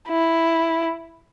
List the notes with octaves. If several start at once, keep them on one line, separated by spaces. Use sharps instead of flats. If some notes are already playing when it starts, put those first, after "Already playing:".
E4